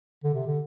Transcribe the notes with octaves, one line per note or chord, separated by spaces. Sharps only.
D3
C3
D3